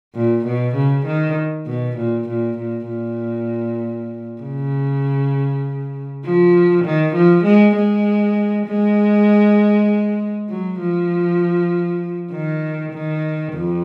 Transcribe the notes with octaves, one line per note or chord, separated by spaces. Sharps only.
A#2
B2
C#3
D#3
B2
A#2
A#2
A#2
A#2
C#3
F3
D#3
F3
G#3
G#3
G#3
F#3
F3
D#3
D#3
F2